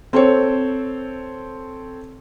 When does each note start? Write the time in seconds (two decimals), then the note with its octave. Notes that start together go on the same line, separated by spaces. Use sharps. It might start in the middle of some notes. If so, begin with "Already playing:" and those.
0.13 C4 A4 C5 C#5